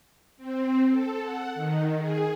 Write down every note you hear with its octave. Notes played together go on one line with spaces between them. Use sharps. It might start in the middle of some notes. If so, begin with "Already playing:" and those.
C4
A4
F#5
D#3
G#4